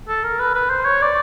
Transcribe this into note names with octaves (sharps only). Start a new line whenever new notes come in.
A4
A#4
B4
B4
C5
C#5
D5